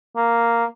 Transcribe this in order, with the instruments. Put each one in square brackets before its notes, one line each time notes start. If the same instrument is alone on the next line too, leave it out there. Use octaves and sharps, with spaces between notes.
[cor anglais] A#3